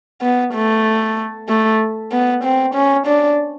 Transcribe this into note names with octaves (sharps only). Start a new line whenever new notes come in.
B3
A3
A3
B3
C4
C#4
D4